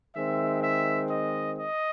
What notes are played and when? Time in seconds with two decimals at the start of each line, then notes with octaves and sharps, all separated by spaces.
0.16 D#3 G#3 C4 E5
0.63 E5
1.10 D#5
1.57 D#5